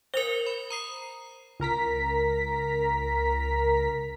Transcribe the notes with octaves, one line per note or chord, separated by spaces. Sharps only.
A#4 C5 F7 G7
B5
A#5 D#6 C7
C#2 A#4 A#5 B6